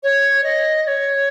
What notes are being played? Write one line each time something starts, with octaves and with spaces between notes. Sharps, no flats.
C#5
D#5
D#5
C#5